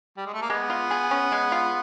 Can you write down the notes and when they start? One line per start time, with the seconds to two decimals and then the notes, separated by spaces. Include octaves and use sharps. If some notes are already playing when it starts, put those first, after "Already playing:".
0.17 G3
0.26 G#3
0.34 A3
0.42 A#3
0.50 G#3 B3
0.70 F4
0.91 G#4
1.11 C#4
1.32 G#3
1.52 F4